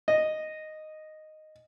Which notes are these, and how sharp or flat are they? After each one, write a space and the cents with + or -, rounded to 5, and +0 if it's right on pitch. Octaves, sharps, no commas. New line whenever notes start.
D#5 -5